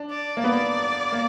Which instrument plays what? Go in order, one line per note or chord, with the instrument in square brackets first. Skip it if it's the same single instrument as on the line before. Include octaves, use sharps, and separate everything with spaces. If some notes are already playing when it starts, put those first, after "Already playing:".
Already playing: [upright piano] D4
[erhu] D5
[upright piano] A#3
[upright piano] B3 [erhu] D5
[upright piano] A#3